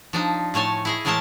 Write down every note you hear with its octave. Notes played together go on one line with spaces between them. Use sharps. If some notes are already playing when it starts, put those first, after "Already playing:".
F3 D4 D#4
A2 A3 C#5 G#5 A5
E4 G#4 D#5
A2 E3 G#3 A3 A#4 A5